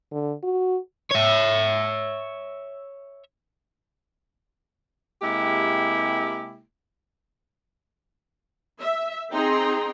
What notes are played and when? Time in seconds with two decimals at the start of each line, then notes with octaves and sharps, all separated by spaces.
0.11 D3
0.43 F#4
1.11 C#5 E5
5.22 C3 G#3 A#3 E4 G4
8.79 E5
9.31 C4 D#4 G#4 G5 A#5 C6